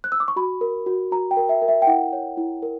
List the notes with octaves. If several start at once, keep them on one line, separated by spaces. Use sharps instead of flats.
F#6
E6
D6
C#6
F#4 B5
A#4
F#4
F#4 A#5
G5
A#4
E5
A#4
E5
G5
E4 F#5
C#5
E4
A#4